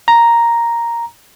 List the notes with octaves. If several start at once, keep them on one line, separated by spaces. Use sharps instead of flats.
A#5